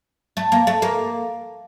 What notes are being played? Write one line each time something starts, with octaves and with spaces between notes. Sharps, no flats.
A3
A#3
A3
A#3